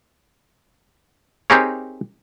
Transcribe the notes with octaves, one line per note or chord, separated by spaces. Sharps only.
C4 D#4 G4 G#4 A#4 C#5